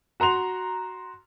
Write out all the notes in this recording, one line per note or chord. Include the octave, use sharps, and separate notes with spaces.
F#4 A#5 C6 F7